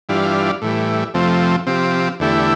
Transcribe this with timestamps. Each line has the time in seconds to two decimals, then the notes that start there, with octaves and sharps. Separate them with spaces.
0.09 G2 E3 G3 D4 F4
0.62 A2 E3 G3
1.14 F2 C3 F3 A3 C4
1.67 C3 F3 C4 G4
2.20 E2 D3 A3 E4 G4